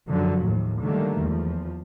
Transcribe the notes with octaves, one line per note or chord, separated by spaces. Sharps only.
F#2 D3 F3 F#3
D#2 A2
D3 D#3 F#3 G3 A3 A#3
E2 F3